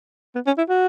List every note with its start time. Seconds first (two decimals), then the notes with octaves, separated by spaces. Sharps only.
0.35 B3
0.46 C#4
0.58 E4
0.69 F#4